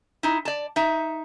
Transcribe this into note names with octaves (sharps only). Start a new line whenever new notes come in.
D#4 E4
D5 A5
D#4 E5